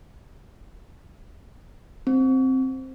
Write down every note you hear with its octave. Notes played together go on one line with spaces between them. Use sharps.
C4